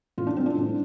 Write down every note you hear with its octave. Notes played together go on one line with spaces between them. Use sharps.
A2 F4
D4
G3 C4
D4
A2